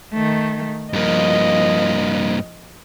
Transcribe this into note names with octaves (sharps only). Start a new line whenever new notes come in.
D#3 A3
G2 F3 A#3 D#5